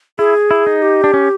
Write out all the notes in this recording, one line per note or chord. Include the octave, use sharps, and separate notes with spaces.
E4 G#4
E4
D#4
G4
D4
C#4